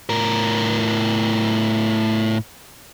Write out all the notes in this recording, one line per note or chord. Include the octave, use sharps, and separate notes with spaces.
A2 A#4